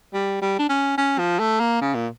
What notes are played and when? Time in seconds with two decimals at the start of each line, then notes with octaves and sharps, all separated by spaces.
0.14 G3
0.42 G3
0.59 D4
0.69 C#4
0.98 C#4
1.19 F3
1.39 A3
1.60 A#3
1.81 C#3
1.95 A#2